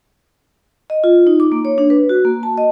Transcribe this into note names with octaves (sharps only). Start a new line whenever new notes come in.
D#5
F4
D#4
D6
A#3
C#5
D4
B4
F#4
A#3
A5
D#5